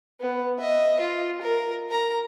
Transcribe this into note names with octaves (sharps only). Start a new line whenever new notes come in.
B3
D#5 E5
F4
A#4
A#4 A#5